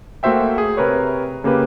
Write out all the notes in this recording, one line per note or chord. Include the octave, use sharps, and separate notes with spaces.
A3 A#3 F#4 C5 E5 G5
G#4
C3 A#4 B4 C#5
C#3 A#3 G4 B4